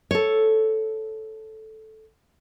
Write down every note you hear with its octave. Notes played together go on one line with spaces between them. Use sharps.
A4 C#5